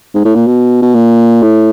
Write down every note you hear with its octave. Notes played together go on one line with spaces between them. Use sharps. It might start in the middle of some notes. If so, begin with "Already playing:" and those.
G#2
A2
A#2
B2
B2
A#2
A2